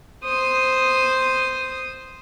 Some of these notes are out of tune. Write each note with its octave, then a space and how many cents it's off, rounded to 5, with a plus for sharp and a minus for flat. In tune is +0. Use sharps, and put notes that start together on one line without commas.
C5 -5 D#6 +0